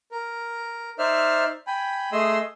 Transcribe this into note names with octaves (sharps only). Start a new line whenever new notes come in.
A#4
D#4 C5 D5 E5 F6
G5 G#5 B5
A3 G#4 D#5 C6 D#6 E6